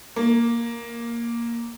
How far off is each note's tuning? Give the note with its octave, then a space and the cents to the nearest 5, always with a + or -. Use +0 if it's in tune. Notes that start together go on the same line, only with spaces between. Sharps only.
A#3 +5